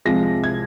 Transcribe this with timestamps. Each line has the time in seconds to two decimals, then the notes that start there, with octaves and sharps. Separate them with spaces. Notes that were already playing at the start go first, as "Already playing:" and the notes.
0.05 C2 C3 F3 G#3 A#6
0.44 G#6